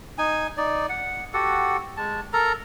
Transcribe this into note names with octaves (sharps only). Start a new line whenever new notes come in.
D#4 G#5
D#4 D5
F#5
F#4 G4 A4 F#5
G#3 A5
A4 A#4 A#5